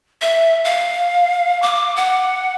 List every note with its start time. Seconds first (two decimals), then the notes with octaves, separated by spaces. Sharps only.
0.22 E5
0.65 F5
1.62 D6
1.96 F#5